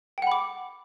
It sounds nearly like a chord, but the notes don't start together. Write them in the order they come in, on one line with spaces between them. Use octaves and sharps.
G5 F#5 B5 D6